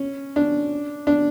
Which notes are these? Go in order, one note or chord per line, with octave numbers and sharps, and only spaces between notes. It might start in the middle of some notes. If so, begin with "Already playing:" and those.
Already playing: C#4
D4
D4